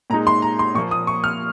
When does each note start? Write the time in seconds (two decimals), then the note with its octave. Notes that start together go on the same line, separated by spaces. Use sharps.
0.10 A#2 G#3 D#4 A#5
0.27 C6
0.42 A#5
0.59 C6
0.74 A#2 F3 A#3 C#6
0.91 D#6
1.07 C#6
1.24 F6